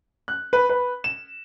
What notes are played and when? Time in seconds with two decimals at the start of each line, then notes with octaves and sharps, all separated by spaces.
0.28 F#6
0.53 B4
0.69 B4
1.04 E7